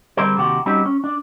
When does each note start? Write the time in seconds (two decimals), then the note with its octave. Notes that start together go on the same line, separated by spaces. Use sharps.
0.17 D3 G3 C4 G#4 A#4 C5
0.37 D#2 C3 F#4 G4 F#5
0.66 G3 C4 C#4 D#4 F#4 G4
0.86 C#4
1.04 D4